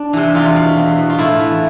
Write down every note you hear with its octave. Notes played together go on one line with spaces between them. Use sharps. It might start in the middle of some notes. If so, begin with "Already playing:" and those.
Already playing: D4
C3 E3
E2 F4
B2
E2
B2
F4
A2 E4
E3